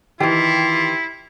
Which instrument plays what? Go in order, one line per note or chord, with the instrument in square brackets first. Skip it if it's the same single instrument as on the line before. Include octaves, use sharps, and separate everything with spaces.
[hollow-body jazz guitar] D#3 E3 [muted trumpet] E4 [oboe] F4 [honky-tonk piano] G4